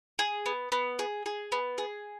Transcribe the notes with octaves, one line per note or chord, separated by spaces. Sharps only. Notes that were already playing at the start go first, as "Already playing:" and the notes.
G#4
B3
B3
G#4
G#4
B3
G#4